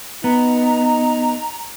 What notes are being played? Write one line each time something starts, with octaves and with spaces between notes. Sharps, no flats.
B3 D#4 A#5